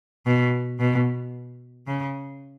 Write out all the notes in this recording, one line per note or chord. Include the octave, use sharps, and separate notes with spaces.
B2
B2
C#3